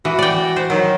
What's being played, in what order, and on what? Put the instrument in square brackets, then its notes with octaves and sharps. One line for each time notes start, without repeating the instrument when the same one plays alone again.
[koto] E3 [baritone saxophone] F#4
[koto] D5 G5
C5
[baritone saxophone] D#3 [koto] F#3